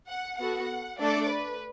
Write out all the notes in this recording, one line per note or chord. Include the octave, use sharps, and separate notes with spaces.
F#5
B3 F#4 A4 F#5
A3 D4 A4 D5
B4